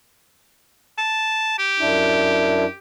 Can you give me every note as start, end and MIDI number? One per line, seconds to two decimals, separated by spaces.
0.98 1.56 81
1.58 2.78 67
1.80 2.65 42
1.80 2.65 62
1.80 2.65 64